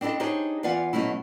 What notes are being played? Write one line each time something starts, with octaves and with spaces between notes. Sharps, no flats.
C4 D4 E4 A4 D#5
D4 D#4 G4 G#4 C5 C#5
E2 F4 D5 F5 F#5 G#5
B2 F#3 A3 C#4 E4